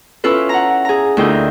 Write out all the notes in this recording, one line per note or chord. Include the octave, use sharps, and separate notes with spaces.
C#4 E4 F4 A4 B4
F#5 A#5
G#4 A#5
D2 E4 F4 A#4 D#5 G5